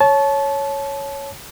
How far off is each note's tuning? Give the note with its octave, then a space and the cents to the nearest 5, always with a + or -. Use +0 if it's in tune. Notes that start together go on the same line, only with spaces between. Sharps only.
C#5 +0 A5 -25